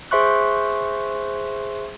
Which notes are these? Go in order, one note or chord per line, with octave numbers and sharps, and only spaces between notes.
G#4 C5 E5 C6 C#6 F#6